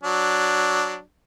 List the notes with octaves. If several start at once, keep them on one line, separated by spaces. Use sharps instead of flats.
F#3 D4